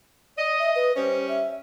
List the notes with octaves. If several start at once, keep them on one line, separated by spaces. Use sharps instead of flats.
D5 D#5
E5
B4
G3 C#4 C5
E5